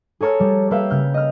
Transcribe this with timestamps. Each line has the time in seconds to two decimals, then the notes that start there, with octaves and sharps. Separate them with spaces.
0.21 G#4 A4 C#5 A#5 F6
0.40 G3
0.71 A#3 B4 C#5 E5 F5 G5
0.90 C#3 F6 G6
1.14 D#5 F6